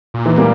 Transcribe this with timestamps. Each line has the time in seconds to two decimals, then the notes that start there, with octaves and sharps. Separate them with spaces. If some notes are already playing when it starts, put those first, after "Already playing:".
0.14 A#2
0.26 E3
0.37 G3 A#3